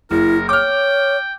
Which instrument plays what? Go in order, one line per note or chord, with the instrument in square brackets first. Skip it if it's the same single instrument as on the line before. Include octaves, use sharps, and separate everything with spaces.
[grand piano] F#1 [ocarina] E4 [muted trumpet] A#4
[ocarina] C#5 [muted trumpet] G5 [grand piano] D6 F6